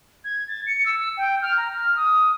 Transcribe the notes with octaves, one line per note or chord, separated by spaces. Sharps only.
G#6
A6
C#7
E6
G5
F6
A#5
F6
D#6